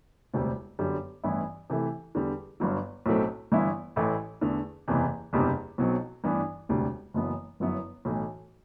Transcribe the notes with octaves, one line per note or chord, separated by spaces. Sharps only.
E1 D2 C3 G3 C4
G1 F#2 D3 G3
A1 G2 E3 B3 E4
C3 E3 A3 E4
E2 D3 G3
G1 G2 F#3
B1 A2 F#3 A3 C4
G1 G2 E3 B3 E4
A1 A2 E3 A3 E4
E2 D3 A3
F#1 E2 C3 E3
F#1 E2 C3 G3 D4
B1 B2 F#3 C4
A1 G2 E3 B3 D4
E1 D2 C3 G3 D4
F#1 F#2 E3 B3 E4
G1 F#2 F#3 B3 E4
B1 A2 E3